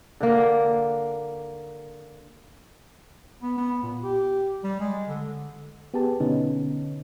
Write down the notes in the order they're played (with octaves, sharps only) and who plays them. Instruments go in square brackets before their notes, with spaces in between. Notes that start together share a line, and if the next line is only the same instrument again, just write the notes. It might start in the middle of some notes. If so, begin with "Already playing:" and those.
[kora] D3 A#3
[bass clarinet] B3
B3
A#2
G4
G3
G#3
D3
[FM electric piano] B3 G4 G#4 A5
B2 D3 B3 C#4 D#4